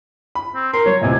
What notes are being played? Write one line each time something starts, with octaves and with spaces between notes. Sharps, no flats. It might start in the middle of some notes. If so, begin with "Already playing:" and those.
B5
C4
A#4 C6
F#3 C#5
D#1 A1 C3 G#5